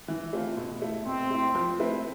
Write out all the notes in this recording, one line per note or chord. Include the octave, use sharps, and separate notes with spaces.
E3
A3 C4 F4
B2
A3 E4
B2 C4
A3 E4
F3
A3 C4 E4 B4